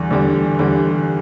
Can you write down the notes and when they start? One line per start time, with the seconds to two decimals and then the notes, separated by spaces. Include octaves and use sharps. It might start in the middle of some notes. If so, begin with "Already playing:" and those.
Already playing: E2 D3 G3
0.11 E2 D3 G3
0.59 E2 D3 G3